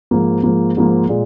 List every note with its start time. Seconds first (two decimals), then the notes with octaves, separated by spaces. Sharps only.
0.11 G#2 F3 A#3
0.43 G#2 F3 A#3
0.77 G#2 F3 A#3
1.09 A#2 G#3